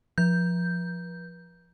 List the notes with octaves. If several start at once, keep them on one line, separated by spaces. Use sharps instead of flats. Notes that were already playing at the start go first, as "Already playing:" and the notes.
F3 G6